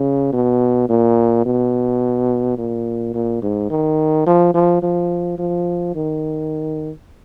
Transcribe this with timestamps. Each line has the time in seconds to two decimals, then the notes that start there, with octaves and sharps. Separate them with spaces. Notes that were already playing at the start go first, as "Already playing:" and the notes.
Already playing: C#3
0.33 B2
0.89 A#2
1.46 B2
2.58 A#2
3.14 A#2
3.42 G#2
3.70 D#3
4.26 F3
4.54 F3
4.83 F3
5.38 F3
5.95 D#3